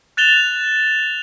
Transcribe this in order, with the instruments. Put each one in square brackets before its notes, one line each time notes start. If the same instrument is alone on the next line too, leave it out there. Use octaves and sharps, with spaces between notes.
[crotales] F#6 A6 E7 F7 G7